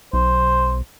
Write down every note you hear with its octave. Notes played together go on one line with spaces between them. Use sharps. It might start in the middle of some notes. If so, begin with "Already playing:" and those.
B1 C5